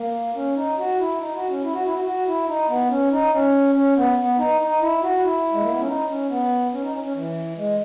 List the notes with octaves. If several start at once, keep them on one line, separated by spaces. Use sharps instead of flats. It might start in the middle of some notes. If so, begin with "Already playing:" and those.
Already playing: A#3
C#4
D#4
F#4
E4
D#4
F#4
C#4
E4
F#4
E4
F#4
F#4
E4
D#4
B3
C#4
D#4
C#4
C#4
B3
B3
D#4
D#4
E4
F#4
E4
G#3
A#3
B3
C#4
D#4
C#4
B3
C#4
D#4
C#4
C#4
E3
G#3